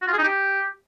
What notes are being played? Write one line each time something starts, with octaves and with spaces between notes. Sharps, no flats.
F#4
F4
G#4
D#4
G4